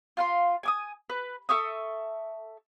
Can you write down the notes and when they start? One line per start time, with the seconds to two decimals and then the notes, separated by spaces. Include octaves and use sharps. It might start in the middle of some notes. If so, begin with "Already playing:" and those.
0.17 F4 F5 C6
0.63 G#5 D6 D#6
1.10 B4
1.49 A4 E5 C#6 D#6